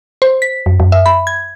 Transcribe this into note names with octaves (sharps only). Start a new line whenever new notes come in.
C5
B6
F#2
F#2
E5
B5
G#6